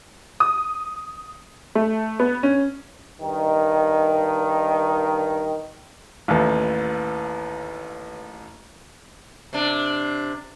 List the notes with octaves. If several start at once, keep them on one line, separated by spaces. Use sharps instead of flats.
D#6
A3
B3
C#4
G2 D#3
A1 D#2 B4 F5
C3 D4